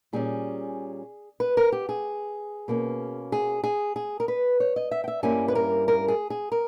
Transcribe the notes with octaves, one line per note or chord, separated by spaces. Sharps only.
A#2 G3 C#4 G#4
B4
A#4
G4
G#4
B2 A#3 C#4
G#4
G#4
G#4
A#4
B4
C#5
D#5
E5
G5
E5
G2 G3 A#3 C#4 E4 G#5
B4
A#4
A#4
G#4
G#4
A#4